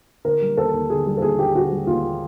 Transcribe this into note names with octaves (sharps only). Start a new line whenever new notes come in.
D3 A#4
G3
D#2 A4
D#2
D3 G#4
G3 G#4
A4
D#2 G#4
D#2 G4
D3 F#4
G3
D#2 F4